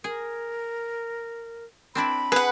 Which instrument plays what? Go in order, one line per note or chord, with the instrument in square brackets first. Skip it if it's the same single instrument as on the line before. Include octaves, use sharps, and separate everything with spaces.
[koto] G#4 [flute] A#4
[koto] C4 D4 E4 [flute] B5
[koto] G#4 [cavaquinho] B4 F#5